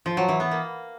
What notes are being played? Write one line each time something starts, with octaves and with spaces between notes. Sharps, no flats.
F3
F#3
E3
B3
A#3